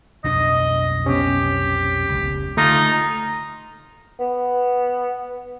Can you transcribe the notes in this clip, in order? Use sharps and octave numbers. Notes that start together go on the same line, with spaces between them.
B1 F2 D4 D#5
C3 B3 C#4 G4
F1 C#2
D3 A3 D#4 F4
B3